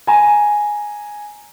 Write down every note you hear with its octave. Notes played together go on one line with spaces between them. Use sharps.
G#5 A#5